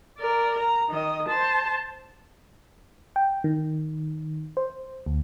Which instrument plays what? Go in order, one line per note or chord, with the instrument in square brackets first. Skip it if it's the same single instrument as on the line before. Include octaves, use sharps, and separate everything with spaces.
[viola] A#4 D5
A#5
D#3 D#5
C5 A5
[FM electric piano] G5
D#3
C5
D2